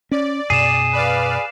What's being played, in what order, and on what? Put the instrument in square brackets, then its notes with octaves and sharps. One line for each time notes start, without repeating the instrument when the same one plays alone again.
[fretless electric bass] C#4 [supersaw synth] D5
[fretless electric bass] F#2 B2 [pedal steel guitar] G#4 [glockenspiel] C7 E7
[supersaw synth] B4 D5 F5